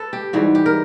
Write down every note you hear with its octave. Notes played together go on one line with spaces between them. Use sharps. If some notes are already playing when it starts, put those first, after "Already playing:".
Already playing: A4 B4
G4
G#2 E3 G3 F#4
G4
A#4